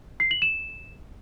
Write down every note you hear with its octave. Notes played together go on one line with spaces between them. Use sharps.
C7
F#7
E7